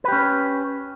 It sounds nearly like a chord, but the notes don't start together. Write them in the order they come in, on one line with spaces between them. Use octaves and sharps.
B4 G4 C#4